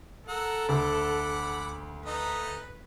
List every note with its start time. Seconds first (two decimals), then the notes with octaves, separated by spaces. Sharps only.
0.29 A4 A#4 F#5 E6
0.69 D2 F#5 B5 D6
2.06 D#4 A4 B4 D#5